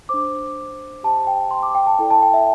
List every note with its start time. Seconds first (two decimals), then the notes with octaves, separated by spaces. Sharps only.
0.09 D4 C5 D6
1.03 G4 C5 A5
1.27 G5
1.51 C6
1.63 D6
1.75 G5
1.87 A5
1.99 E4 A4 D5 G5
2.11 A5
2.22 G5
2.34 E5